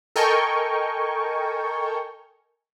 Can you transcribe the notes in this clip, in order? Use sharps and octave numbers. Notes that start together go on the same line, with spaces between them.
A4 A#4 D#5 G5 G#5 C#6